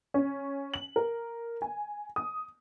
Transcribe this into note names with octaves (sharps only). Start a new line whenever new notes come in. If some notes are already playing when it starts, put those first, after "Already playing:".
C#4
F#7
A#4
G#5
D#6